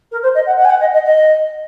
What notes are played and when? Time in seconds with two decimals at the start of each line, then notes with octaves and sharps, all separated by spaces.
0.11 A#4
0.23 C5
0.35 D#5
0.46 F#5
0.58 F#5
0.65 G#5
0.70 F#5
0.80 D#5
0.93 D#5
1.05 D#5